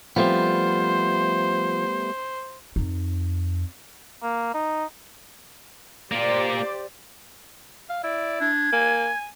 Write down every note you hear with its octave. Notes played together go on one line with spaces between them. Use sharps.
F3 G3 A3 B3 C4 C5
F2 D#4
A#3
D#4
A#3 F4 G4 C5 D5
F5
E4 D5
D4 G#6
A#3 G#5